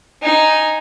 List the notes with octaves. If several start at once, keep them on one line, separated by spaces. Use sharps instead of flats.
D#4 G#5